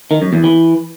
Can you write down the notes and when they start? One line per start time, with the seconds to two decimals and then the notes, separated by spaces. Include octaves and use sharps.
0.11 D#3
0.22 F#2
0.33 E2
0.44 E3